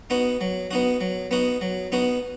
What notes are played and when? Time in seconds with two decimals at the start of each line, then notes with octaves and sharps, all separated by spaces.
0.10 B3 D#4 F#4
0.41 F#3
0.71 B3 D#4 F#4
1.01 F#3
1.31 B3 D#4 F#4
1.61 F#3
1.92 B3 D#4 F#4